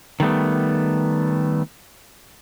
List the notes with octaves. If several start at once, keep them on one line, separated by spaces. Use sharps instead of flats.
D#3 G3 A3 B3